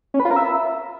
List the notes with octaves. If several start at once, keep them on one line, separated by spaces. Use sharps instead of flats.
C#4
B4
F4
A#4
E5